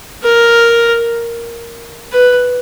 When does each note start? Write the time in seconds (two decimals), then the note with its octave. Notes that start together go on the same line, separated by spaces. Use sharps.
0.23 A#4
2.12 B4